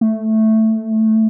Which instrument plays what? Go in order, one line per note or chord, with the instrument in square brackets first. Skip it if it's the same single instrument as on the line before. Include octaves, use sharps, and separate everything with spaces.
[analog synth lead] A3